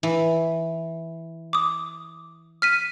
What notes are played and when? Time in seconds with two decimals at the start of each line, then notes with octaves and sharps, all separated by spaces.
0.03 E3
1.53 D6 D#6
2.62 F6 B6 D#7